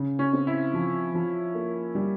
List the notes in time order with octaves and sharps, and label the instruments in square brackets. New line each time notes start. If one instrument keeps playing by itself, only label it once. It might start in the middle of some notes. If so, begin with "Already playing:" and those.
Already playing: [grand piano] C#3
[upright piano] C#4
[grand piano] C4
[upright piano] E4
[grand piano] F3
F3
A#3
G3